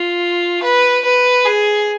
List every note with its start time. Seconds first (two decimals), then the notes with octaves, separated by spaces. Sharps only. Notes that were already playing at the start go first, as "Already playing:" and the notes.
Already playing: F4
0.63 B4
1.05 B4
1.45 G#4